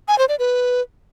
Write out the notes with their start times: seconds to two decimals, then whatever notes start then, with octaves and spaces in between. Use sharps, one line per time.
0.08 G#5
0.18 C5
0.29 D5
0.39 B4